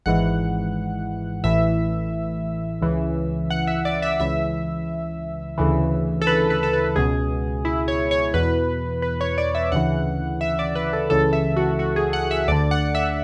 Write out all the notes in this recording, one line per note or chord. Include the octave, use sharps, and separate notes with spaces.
G#1 G#2 E3 F#5
A1 A2 E3 E5
C#2 C#3 E3
F#5
E5
D5
E5
C#2 C#3 E3 E5
D2 C#3 E3
A4
B4
B4
A4
B4
C#2 B2 G#4
E4
C#5
C#5
E2 B2 B4
B4
C#5
D5
E5
D2 C#3 E3 F#5
E5
D5
B4
A4
C#2 C#3 E3 A4
E5
F#4
F#4
G#4
F#5
E5
D2 D3 D5
F#5
E5